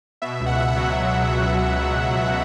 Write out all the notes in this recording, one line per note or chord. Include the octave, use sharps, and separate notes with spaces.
B2 E5
C#2
F#5
C#2 E5
F#5
F#3
B2
C#2
C#2
F#3